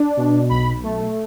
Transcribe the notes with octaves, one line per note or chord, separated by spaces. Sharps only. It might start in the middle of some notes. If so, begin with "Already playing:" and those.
Already playing: D4
B2
B1 B5
A3